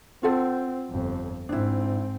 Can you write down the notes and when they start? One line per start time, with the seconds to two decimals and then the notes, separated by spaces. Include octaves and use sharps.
0.23 C4 F4 A4 F#5
0.90 G1 F2
1.49 G#2 C4 D4 E4